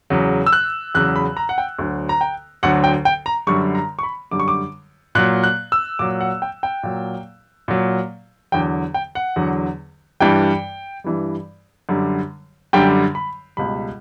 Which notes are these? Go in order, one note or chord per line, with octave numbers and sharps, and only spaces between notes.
E2 C#3 F#3
E6
F#6
E2 C#3 F#3 F#6
B5
A#5
F#5
G5
D2 D3 F#3
A#5
G5
D2 D3 F#3 F#5
G5
G5
A#5
F#2 D3 G3 C#6
A#5
C#6
B5
F#2 D3 G3 D6
C#6
D6
A#2 F#3 F#6
F#6
E6
A#2 F#3 D6
F#5
G5
G5
A#2 F#3
A#2 F#3
E2 D3 F#3 G5
G5
F#5
E2 D3 F#3
G2 E3 G3 G5
G2 E3 G3
F#2 D3 G3
F#2 D3 G3 G5
B5
C#2 B2 G3 B5